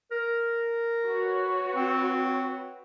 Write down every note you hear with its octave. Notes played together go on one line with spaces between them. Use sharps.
A#4
F#4 B4 C#5
C4